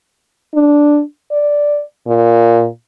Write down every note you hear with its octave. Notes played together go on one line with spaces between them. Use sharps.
D4
D5
A#2